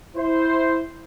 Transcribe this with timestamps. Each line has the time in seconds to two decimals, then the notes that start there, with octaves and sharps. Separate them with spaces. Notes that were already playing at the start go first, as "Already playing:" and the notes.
0.17 E4 C5